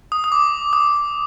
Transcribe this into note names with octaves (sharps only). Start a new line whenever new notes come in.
D#6
D#6
D6
D#6